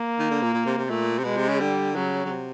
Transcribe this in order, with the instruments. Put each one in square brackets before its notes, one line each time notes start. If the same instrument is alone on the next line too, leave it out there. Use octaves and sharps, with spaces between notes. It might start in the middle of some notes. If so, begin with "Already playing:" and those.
Already playing: [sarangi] A#3
[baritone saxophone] D#3
D3
A#2
A#2
C3
C3
[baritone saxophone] A#2 [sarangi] A3
[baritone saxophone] C3
[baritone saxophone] B2 [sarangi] G#3
[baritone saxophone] C3
C#3
[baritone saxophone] D3 [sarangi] G3
[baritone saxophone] C#3 [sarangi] F#3
[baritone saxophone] C#3
C3